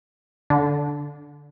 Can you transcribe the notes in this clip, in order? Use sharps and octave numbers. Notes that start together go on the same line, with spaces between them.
D3